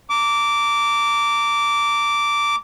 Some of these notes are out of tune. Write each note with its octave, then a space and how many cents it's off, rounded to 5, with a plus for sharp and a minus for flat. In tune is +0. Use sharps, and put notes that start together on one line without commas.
A#5 -30 D6 -10